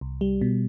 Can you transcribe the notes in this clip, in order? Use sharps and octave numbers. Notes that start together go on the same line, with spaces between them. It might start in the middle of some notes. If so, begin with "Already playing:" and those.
C2
G3
B2